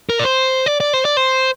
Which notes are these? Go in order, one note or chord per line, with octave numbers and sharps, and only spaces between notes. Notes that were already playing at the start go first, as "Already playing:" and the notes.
A#4
D5
C5
D5
D5
C5
D5
C5